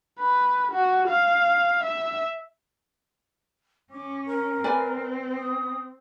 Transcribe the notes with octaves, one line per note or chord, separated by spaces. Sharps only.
B4
F#4
F5
E5
C#4 D6
A#4
C4 B4 D5 G#5
D#6